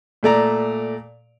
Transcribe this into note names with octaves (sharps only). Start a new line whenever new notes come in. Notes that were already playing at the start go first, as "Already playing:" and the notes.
A#2 A3 D5 A#5